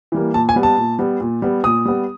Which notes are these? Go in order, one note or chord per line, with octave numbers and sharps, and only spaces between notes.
E3 G3 A#3
A#2 A5
G#5
G3 B3
A5
A#2
G3 B3
A#2
G3 B3
A#2 D#6
G3 B3